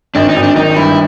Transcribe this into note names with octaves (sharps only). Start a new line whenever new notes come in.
G#1 D4
D#4
G#1
D4
D#3 D#4
G2 E4